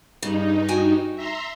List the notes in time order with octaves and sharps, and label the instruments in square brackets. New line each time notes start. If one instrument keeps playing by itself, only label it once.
[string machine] G2 D#4 [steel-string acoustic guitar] C#3
[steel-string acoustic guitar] F#4 G5 G#5
[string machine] E5 A#5 C6